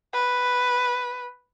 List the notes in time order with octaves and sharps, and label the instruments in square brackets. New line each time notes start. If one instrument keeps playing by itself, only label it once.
[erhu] B4